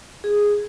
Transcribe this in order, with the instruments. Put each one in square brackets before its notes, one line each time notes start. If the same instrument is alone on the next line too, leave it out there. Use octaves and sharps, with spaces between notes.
[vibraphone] G#4